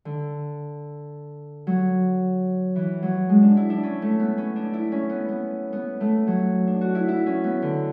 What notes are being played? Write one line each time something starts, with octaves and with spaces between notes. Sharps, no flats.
D3
F#3
E3
F#3
G#3
D4
E4
D4
C#4
A3
B3
C#4
D4
E4
C#4
B3
B3
B3
A3
F#3
D4
F#4
E4
E4
C#4
B3
D3